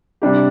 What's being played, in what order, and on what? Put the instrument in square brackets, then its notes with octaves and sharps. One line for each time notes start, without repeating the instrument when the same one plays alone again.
[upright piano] C3 G3 D4 G4